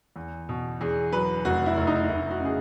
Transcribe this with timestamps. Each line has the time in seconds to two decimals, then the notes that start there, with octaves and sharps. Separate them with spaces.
0.16 E2
0.49 B2
0.81 E2 G#4
1.12 F#3 B4
1.45 F1 F#4
1.66 E4
1.78 F1
1.87 D#4
2.09 F1 E4
2.31 F#4
2.41 C#3 G#4